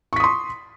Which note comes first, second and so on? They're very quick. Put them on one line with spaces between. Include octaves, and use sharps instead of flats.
C#6 B6 D#6 C6